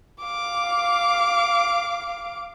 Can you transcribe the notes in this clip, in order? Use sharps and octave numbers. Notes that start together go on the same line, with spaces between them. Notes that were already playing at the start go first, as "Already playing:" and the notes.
F5 D6